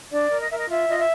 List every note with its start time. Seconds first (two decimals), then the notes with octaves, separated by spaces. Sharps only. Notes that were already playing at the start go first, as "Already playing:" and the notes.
0.11 D4 D5
0.30 A#4
0.41 D#5
0.49 A#4 E5
0.58 D#5
0.69 F4 E5
0.89 F4 D#5
0.99 E5